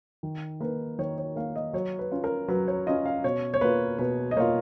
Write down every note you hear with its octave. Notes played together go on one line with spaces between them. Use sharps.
D#3
A#3 D#4 B4
D#3 C#5
C#5
A#3 D#4 F5
D#5
F#3 C#5
B4
C#4 F4
A#4
F#3 B4
C#5
C#4 F4 D#5
F5
B2 C#5
C#5
A#3 F4 B4
B2 B4
D#5
A#3 F4 C#5